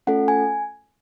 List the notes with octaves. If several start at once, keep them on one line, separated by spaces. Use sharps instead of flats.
A3 C#4 F4 A4 F#5
G#5